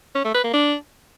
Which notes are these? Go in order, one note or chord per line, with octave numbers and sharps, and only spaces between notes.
C#4
A3
B4
A#3
D4